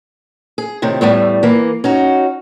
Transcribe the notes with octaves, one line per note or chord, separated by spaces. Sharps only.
G#4
A2 C3 D#3
E2 A2 G3 A3
E3 A#3
C#4 D#4 F#4